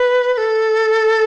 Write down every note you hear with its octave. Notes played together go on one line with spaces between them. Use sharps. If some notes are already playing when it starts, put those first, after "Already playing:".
Already playing: B4
B4
A4